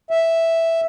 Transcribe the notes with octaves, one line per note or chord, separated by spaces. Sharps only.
E5